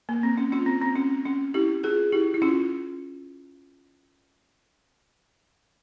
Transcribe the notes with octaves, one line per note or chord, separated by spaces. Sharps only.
A#3
C4
C#4
C#4 F4
C4
C4
C#4
C#4
E4 G4
F4 G#4
E4 G4
E4
C#4 F4